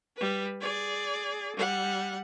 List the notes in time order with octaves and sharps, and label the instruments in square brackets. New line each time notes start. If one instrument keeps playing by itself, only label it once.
[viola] G3 B4
G#4 D5
G3 F#5